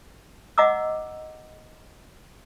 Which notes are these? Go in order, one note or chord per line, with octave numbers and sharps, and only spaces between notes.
D#5 E5 F#5 A#5 D6 E6